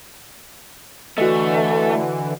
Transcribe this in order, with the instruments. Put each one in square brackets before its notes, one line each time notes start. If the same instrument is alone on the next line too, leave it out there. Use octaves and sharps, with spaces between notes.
[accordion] D3 E3 [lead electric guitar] A3 [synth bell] F#4 D#5